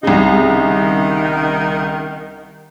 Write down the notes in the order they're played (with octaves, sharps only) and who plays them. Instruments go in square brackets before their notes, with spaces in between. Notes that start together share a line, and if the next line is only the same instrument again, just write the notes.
[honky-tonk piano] C2 C#3 [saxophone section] G#3 D#4
[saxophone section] D#3